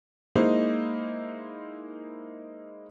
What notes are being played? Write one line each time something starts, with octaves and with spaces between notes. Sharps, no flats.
G#3 A#3 D#4 E4 C5 D#5